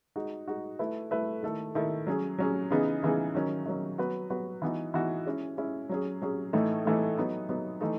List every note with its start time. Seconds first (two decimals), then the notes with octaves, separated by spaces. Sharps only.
0.16 G#3 D#4 F#4
0.48 G#3 D#4 F#4
0.79 A3 E4 B4 E5
1.11 A3 E4 B4 E5
1.43 D#3 A3 E4 A4
1.75 D#3 A3 E4 A4
2.07 F#3 C#4 G#4
2.39 F#3 C#4 G#4
2.70 C#3 E3 B3 D#4 G#4
3.03 C#3 E3 B3 D#4 G#4
3.35 D#3 F#3 C#4
3.66 D#3 F#3 C#4
3.98 F#3 B3 F#4 B4
4.30 F#3 B3 F#4 B4
4.62 E3 B3 D#4 F#4
4.94 E3 B3 D#4 F#4
5.26 G#3 C#4 E4
5.57 G#3 C#4 E4
5.89 F#3 C#4 G#4
6.22 F#3 C#4 G#4
6.53 A2 E3 A3 D#4
6.85 A2 E3 A3 D#4
7.17 F#3 B3 D#4
7.49 F#3 B3 D#4
7.81 E3 A3 D#4